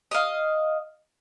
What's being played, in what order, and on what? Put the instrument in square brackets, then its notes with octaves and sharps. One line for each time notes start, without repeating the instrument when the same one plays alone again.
[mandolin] D#5 F5